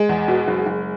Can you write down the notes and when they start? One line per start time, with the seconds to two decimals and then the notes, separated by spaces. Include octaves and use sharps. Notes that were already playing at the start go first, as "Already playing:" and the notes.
Already playing: G#3
0.09 E2
0.28 B2
0.48 F#1
0.67 F#1